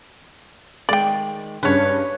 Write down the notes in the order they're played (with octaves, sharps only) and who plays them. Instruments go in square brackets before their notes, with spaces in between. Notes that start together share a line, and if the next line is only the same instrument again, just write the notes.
[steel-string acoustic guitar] D#3 G#3 [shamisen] D5 G5
[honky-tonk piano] G2 C#3 [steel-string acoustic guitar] C#4 [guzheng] B4 C#5